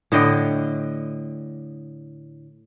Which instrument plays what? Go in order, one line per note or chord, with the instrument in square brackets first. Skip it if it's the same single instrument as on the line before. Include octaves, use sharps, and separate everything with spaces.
[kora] A2 D3 D#5 G5